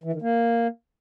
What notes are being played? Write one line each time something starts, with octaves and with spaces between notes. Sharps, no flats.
E3
D#3
A#3